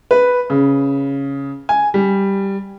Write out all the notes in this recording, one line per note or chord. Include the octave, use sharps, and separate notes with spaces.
B4
C#3
G#5
G3